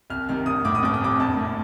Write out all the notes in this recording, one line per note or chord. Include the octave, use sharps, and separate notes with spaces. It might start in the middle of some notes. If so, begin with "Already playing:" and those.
C2 F6
C3 D#3 F6
A#1 D#6
A2 D6
D#6
G1 D6
D#6
F2 C3 D6
A#1 A5
A2